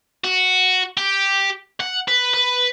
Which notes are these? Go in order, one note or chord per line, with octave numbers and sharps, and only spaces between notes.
F#4
G4
F#5
B4
B4